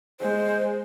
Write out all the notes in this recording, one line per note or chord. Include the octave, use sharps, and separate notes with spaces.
G#3 C5